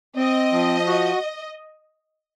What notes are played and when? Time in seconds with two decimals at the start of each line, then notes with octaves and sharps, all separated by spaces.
0.16 C4 D#5
0.52 F3
0.87 F#4